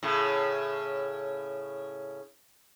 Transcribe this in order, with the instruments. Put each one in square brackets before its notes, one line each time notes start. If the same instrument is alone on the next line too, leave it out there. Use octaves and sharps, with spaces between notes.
[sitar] A2 C#3